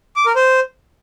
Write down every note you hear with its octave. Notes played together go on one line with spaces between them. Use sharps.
D6
A#4
C5